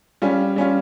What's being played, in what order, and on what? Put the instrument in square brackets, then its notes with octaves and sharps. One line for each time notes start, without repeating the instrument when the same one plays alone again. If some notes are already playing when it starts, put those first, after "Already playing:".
[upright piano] G3 C#4 F4
G3 C#4 F4